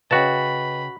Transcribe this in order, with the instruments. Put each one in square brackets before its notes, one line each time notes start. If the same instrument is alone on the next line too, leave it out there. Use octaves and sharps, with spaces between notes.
[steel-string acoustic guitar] C#3 G5 [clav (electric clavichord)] F#4 A5 [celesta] B4 D#5 [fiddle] B5